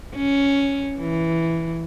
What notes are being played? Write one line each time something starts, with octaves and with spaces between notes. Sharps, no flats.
C#4
E3